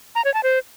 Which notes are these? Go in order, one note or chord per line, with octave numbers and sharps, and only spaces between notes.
A#5
C#5
A5
C5